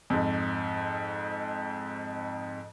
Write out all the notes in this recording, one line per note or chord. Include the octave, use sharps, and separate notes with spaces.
F2 G#2